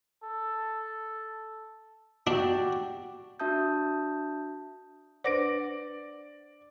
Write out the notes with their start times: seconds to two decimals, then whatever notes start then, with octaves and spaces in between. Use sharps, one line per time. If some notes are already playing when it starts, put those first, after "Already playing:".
0.23 A4
2.27 D4 F#4 G4 D5
3.40 D4 F#4 E5 A5 D#6 G6
5.24 D4 B4 C5 D5 F#5 D6 A#6 D7